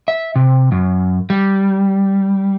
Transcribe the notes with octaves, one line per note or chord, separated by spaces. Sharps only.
E5
C3
F#2
G3